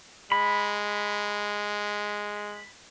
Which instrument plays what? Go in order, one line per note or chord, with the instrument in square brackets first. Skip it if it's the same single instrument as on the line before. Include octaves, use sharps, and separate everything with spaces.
[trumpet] G#3 [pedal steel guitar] B5